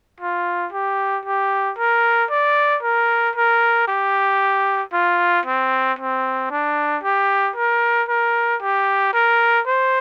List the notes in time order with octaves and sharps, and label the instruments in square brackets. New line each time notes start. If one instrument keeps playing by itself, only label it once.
[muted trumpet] F4
G4
G4
A#4
D5
A#4
A#4
G4
F4
C4
C4
D4
G4
A#4
A#4
G4
A#4
C5